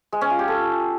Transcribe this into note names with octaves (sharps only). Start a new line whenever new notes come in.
G#3
C#4
F4
G4
A4